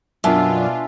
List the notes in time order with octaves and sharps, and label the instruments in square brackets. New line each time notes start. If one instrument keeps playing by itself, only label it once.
[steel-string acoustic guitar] F#2 [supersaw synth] B2 D4 F4 [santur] E5 G#5 A5